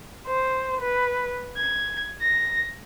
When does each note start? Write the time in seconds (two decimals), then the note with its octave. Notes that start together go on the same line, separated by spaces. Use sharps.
0.24 C5
0.79 B4
1.55 G#6
2.22 A#6